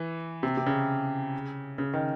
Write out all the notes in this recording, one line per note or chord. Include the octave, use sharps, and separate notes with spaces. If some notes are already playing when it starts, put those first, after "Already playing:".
Already playing: E3
C3
C3
C#3
C#3
D#3